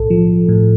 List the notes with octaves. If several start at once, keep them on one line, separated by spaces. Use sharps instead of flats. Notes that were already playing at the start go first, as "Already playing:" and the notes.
Already playing: B1 A2 A4
F3
A2